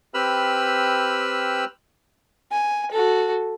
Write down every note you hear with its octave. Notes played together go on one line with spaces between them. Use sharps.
C4 G4 B4 B5 E6 F6
G#5
F#4 A4